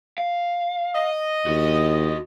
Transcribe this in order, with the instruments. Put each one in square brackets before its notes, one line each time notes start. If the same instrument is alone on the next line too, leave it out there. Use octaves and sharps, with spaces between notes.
[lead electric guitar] F5
[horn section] D#5
[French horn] D#2 [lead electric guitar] D4 F#4